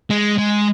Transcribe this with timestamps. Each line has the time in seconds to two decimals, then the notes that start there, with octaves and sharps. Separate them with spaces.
0.10 G#3
0.38 G#3